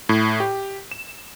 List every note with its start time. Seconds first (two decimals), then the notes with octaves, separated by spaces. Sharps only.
0.09 A2
0.40 G4
0.91 E7